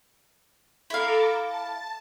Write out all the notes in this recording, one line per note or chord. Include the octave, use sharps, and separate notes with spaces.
E4 A4 F5 A#5 D6
A5